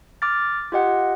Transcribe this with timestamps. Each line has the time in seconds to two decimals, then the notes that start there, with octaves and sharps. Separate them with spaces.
0.22 D6 F6 A6
0.72 F4 G4 D#5 F#5